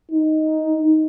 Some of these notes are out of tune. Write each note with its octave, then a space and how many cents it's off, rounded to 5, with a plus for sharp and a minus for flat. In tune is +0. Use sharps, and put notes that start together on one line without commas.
D#4 +5